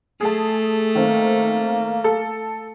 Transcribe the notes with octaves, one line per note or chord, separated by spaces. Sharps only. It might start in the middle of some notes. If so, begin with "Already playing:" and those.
A3 G#4 A5
D#3 A#3 C4
A4